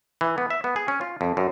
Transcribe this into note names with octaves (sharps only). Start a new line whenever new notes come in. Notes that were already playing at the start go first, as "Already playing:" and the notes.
E3
B3
E5
B3
G#4
C#4
F4
F2
F#2